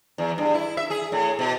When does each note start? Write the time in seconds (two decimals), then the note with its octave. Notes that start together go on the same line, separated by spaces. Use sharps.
0.18 E2
0.38 G2
0.54 E4
0.77 E5
0.90 G#4
1.12 A2
1.39 B2